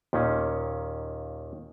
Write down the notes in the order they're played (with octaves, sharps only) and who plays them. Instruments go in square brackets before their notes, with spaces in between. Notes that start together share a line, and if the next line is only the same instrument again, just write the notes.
[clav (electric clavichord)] D#2 A#2 D#3 C#4